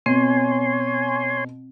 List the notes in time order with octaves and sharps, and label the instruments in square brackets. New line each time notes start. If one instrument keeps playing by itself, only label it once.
[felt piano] B2 [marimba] C4 [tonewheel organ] C#5 G#5 C6